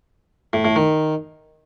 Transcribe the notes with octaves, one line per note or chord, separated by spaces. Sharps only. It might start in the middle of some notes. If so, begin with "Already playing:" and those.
A2
A2
D#3